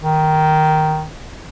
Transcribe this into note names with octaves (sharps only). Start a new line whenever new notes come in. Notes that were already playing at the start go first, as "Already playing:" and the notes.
D#3